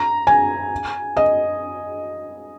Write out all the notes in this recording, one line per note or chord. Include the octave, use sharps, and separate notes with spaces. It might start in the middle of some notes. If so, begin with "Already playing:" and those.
Already playing: A#5
G#5
D#5